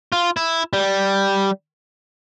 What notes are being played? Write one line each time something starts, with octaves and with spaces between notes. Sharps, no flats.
F4
E4
G3